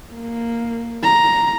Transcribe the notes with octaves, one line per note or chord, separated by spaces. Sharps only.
A#3
A#5